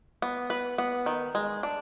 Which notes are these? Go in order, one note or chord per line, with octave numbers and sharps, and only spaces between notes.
B3
B4
B3
D#3
G#3
D4